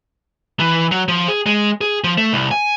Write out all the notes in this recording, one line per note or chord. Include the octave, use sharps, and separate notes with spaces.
E3
F#3
F3
G#4
G#3
G#4
F3
A3
C2
G#5